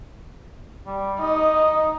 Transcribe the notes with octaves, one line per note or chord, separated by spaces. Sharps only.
G3
D#4 D#5